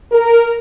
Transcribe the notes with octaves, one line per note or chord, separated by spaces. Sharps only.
A#4